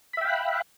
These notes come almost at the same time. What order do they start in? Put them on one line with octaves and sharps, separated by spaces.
B5 E5 G5 F5 F#6